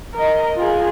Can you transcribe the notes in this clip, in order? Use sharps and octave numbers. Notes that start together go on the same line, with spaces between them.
A#4 D#5
F4 G#4